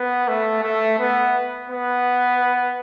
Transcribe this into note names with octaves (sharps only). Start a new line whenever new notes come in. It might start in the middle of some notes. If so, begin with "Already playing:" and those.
Already playing: B3
A3
A3
B3
B3